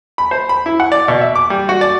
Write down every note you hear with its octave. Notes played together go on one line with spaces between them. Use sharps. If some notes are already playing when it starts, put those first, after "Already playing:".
B5
C5
B5
E4
F#5
D5
B2
E5
D6
G3
F#4
D5